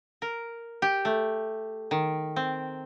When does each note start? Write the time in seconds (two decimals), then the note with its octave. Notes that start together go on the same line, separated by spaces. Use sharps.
0.22 A#4
0.82 G4
1.05 A3
1.91 D#3
2.36 C4